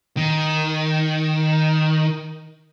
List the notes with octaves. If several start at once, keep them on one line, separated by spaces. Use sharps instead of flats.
D#3